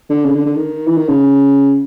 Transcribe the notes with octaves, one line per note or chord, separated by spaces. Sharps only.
D3
C#3
D3
D3
D#3
E3
D#3
C#3